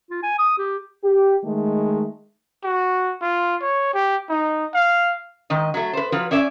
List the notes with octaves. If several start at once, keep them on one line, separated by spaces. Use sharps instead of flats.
F4
G#5
D#6
G4
G4
D#3 G#3 A3
F#4
F4
C#5
G4
D#4
F5
G#2 D#3 D#5
F#3 A3
B4 C5
F3 F#3 F4 B4
C#4 C#5 D5 E5